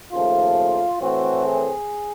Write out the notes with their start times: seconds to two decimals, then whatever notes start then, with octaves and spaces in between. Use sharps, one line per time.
0.12 D#2 C#3 F3 A3 F4
1.01 A2 E3 A3 C4 F#4
1.45 G#4